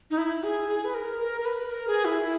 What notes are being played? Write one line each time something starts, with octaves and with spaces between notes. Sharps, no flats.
D#4
E4
G#4
G#4
B4
A#4
A#4
A#4
B4
A#4
G#4
E4
E4